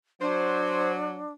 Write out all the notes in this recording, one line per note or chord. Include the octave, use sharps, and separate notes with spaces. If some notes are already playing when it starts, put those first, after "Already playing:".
F#3 D4 C5